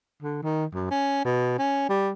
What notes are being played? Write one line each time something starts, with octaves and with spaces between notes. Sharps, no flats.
D3
D#3
F#2
C#4
B2
C#4
G3